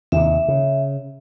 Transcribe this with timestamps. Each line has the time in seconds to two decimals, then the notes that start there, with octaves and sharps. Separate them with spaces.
0.12 D#2 C3 E5
0.48 C#3